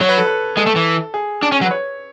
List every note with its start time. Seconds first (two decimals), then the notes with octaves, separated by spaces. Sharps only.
0.01 F#3 C#5
0.09 B4
0.18 A4
0.26 B4
0.57 G#3 A4
0.67 A3
0.76 E3
1.14 G#4
1.42 D4
1.52 C#4
1.61 F#3
1.65 B4
1.71 C#5